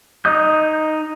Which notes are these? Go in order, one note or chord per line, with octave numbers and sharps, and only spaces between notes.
D#4 D#5 D#6 G6